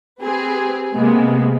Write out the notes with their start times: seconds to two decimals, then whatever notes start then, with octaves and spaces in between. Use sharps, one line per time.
0.21 C4 G4 G#4 B4
0.96 C3 G#3 A#3 B3